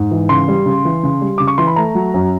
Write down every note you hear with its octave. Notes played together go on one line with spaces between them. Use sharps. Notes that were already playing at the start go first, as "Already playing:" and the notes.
Already playing: G#2
E3
C#3 C6
G3
C#3
E3
C#3
G3
C#3 D6
C#6
E3 C6
B5
A3 A#5
F#3
F#2